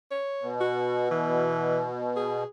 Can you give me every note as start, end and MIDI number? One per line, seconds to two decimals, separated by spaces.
0.11 0.50 73
0.42 2.44 47
0.61 1.09 66
1.11 1.86 52
2.16 2.46 68